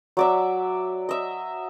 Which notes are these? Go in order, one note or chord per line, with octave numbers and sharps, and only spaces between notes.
F#3 D5 E5
D#5 E5